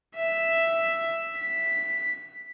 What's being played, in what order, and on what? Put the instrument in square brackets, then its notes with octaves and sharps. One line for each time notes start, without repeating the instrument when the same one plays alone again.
[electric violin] E5
B6